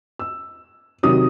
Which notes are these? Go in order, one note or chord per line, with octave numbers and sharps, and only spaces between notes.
E6
C3 D#3 F#3 D#6